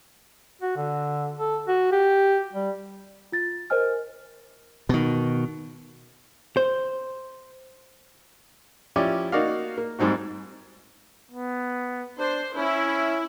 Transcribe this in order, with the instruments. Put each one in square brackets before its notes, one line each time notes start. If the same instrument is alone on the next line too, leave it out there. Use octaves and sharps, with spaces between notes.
[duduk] F#4
D3
A4
F#4
G4
G3
[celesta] F4 A6
A#4 C5 D#5 G#5 F6
[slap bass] B2 D#3
[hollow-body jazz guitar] C5
[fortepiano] F3 C#4 E4 G4 D5
A#3 D#4 F#4 D5 D#5 F5
A#3
G#2 G3 C4 D#4 F#4
[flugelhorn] B3
[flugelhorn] D4 [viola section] C5
[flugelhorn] C#4 [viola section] E4